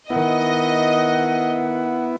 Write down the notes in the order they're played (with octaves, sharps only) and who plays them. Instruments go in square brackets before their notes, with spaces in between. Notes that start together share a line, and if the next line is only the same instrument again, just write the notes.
[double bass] D#3 [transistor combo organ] B3 E4 [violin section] D#5 [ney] F#5